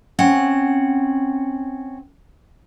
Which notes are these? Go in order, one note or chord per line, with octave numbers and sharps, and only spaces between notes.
C4 C#4 F#5